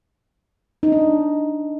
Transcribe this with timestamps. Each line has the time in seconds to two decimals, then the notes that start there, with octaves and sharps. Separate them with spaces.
0.83 D#4
0.92 D4